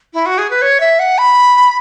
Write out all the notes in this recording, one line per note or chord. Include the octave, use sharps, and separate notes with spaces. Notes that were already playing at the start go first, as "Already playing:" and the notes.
E4
F#4
G#4
B4
C#5
E5
F#5
B5